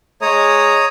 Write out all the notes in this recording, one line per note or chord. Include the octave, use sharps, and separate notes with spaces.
G#3 C#5 A#5 D#6